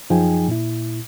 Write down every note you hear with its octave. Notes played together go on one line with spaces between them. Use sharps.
F#2 F3 D#4 G#4 G5 G#5
A#2 E4